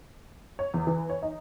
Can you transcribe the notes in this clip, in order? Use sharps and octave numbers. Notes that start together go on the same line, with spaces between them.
C#5
E2
E3
C#5
D#4